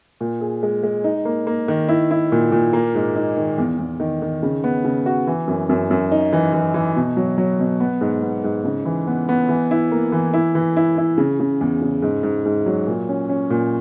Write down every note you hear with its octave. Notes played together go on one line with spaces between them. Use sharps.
A#2
G#4
G#3
G#3
D#4
A#3
A#3
D#3
E4
E4
A#2
A#2
A#3
G#2
D#4
D#3
E2
E2
D#3
D#3
C#3
B3
C#3
F#4
E3
F#2
F#2
F#2
D#4
E3
E3
E3
B2
F#3
F#3
B2
B3
G#2
B3
G#2
C#3
E3
B3
B3
E3
E4
A#3
E3
E4
E3
E4
E4
C#3
C#3
E2
C#3
G#2
G#2
G#2
F#3
A#2
C#4
C#4
A#2